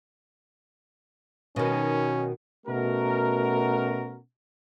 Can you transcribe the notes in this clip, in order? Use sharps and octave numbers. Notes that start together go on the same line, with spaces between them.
B2 D#3 C#4
B2 A3 C#4 F#4 A#4